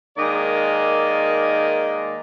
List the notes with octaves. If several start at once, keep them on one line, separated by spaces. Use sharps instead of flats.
D#3 G#3 A#3 D5 D#5